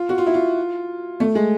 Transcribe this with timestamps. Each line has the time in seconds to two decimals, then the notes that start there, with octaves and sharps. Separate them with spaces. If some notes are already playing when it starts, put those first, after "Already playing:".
Already playing: F4
0.09 F#4
0.18 F4
0.27 E4
0.34 F4
1.20 A3
1.35 G#3